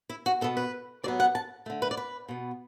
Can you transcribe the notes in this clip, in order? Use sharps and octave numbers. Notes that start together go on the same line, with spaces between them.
E4
F#4
B2 B3 A4
B4
A2 F#3 B3 D5
F#5
A5
D3 A3
B4
D5
B4
B2 B3